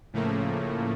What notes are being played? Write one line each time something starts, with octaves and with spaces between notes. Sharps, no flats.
A2 C#3 F3 A3 A#3